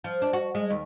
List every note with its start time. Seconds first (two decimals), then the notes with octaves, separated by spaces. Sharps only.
0.04 F3
0.22 D4
0.33 F#4
0.55 G#3
0.70 D#2